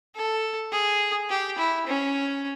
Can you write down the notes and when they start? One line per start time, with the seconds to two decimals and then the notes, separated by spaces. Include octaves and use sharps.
0.16 A4
0.72 G#4
1.29 G4
1.58 E4
1.87 C#4